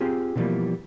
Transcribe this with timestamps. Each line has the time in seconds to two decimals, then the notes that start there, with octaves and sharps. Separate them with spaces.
0.01 C4 F4 G4 G#4
0.36 B2 D3 E3 F3 G3 A#3